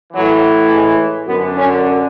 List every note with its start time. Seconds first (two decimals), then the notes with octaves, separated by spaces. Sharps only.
0.13 A2 E3 F#3
0.71 G#3
1.27 F#2 D3 B3
1.56 C#4